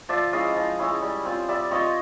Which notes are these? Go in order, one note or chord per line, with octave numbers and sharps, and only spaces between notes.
F3 D5 E5
G#3 C#4 E4 D#5 F5
F3
G#3 C#4 E4
G3
C4 F4
G3 D5 E5
C4 F4 C#5 D#5